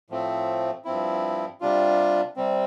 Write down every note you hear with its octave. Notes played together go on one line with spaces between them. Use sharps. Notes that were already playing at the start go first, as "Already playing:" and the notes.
A2 F3 A3 C4
G2 F3 C4 E4
C3 G3 D4 F4
C3 G3 C4